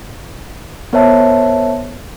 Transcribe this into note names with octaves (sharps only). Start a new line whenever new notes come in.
B3 A#4 C5 C#5 E5 A5